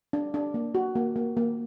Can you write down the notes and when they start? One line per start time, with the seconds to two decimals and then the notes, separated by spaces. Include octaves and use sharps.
0.13 D4
0.34 D4
0.54 A#3
0.75 F#4
0.95 A#3
1.16 A#3
1.37 A#3